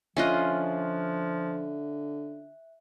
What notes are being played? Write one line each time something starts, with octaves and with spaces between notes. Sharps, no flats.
D3 F3 C#4 F4 D#5 E5 F#6